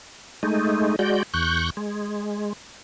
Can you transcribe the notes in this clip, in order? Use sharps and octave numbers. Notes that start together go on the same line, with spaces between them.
G#3 A3 D#4
G#3 F#4 D5 G6
E2 C#6 F#6 G6
G#3